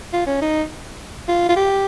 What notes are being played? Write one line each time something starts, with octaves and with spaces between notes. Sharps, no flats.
F4
C#4
D#4
F4
F4
G4